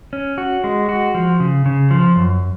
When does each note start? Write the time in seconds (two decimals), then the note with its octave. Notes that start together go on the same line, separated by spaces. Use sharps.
0.13 C#4
0.38 F#4
0.64 G#3
0.89 F#4
1.15 F3
1.40 C#3
1.66 C#3
1.91 F3
2.16 F#2